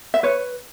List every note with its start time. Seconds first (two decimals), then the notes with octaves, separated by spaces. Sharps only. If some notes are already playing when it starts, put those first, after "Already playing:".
0.14 E5
0.23 B4 C#5